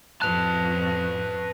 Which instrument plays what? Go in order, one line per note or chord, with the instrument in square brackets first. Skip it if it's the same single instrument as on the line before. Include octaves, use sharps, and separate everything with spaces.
[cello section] F2 [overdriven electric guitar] B4 A5 [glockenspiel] F#6 F7